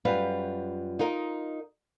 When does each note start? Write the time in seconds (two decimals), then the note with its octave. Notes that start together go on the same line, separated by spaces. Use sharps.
0.05 F#2 G3 F4 B4 F5
0.99 D#4 F4 A#4 D#5